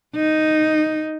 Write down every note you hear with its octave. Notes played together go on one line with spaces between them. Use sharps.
D#4